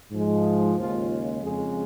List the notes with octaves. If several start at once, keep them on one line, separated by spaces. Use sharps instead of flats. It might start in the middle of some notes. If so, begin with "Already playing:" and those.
G#2 F3 G#3
D#2 C#3 G#3 F4
F2 C#3 G#3 G#4